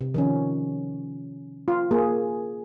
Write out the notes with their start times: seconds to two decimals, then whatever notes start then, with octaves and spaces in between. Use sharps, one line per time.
0.01 C3
0.14 D#3 F3 C#4
1.68 F4
1.91 A#3 G#4